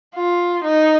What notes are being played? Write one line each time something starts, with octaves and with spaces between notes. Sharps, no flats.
F4
D#4